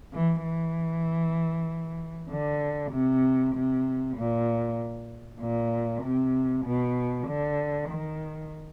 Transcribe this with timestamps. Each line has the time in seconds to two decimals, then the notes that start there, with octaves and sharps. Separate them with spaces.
0.13 E3
0.43 E3
2.30 D3
2.92 C3
3.55 C3
4.17 A#2
5.40 A#2
6.03 C3
6.65 B2
7.27 D3
7.90 D#3